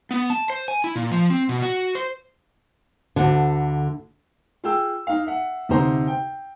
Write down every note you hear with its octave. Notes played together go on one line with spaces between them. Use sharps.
B3
A5
C5
G#5
E4
A#2
F3
C4
B2
F#4
C5
D2 D3
F4 G#4 G5 E6
D#4 F5
E5 F#5
D2 C3 D#4 C5 A#5
G5